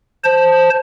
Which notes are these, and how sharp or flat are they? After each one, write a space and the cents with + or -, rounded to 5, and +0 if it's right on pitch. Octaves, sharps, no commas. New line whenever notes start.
C5 +0 A5 +0